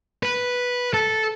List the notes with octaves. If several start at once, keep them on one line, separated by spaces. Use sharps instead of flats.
B4
A4